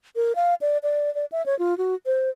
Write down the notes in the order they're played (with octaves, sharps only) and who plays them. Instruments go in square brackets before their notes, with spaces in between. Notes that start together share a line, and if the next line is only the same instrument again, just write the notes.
[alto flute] A#4
F5
D5
D5
D5
E5
C#5
F4
F#4
C5